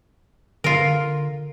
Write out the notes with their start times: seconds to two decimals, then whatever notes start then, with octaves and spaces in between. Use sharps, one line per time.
0.64 D3 F4 A#4